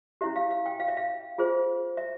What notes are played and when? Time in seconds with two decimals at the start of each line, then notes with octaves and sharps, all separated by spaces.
0.21 C#4 E4 G4 E5
0.36 F5
0.51 F5
0.66 G5
0.80 F5
0.88 E5
0.97 F5
1.38 F4 G#4 C5
1.97 E5